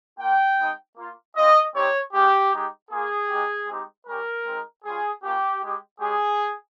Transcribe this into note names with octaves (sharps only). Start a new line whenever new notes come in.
A#3 F4 G5
G#3 C4 D#4
A#3 F4
C4 F4 D#5
G3 C4 D#4 G4 C#5
G#3 C#4 F4 G4
G#3 D#4 G4
A#3 F4 G#4
G#3 D#4 G4
G#3 C4 D#4 G4
G3 C#4 G4 A#4
G#3 C4 D#4
G3 C#4 F4 G#4
A#3 C#4 F4 G4
G#3 D#4 G4
G#3 C#4 G4 G#4